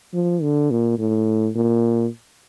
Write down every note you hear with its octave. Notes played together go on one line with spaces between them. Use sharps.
F3
D3
A#2
A2
A#2